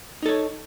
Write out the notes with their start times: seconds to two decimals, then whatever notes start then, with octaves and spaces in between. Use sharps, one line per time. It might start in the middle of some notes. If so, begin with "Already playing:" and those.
0.23 D#4
0.26 A4
0.29 C#5